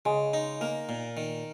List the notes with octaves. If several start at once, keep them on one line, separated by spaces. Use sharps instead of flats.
C#3 G#3
D#4
A#3 A#4
A#2
D#3